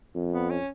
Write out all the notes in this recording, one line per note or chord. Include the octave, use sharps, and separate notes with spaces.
F2
B3
C#4